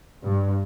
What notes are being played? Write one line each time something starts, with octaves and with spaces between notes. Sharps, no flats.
G2